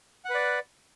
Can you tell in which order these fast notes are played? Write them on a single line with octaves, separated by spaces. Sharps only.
F#5 B4 D5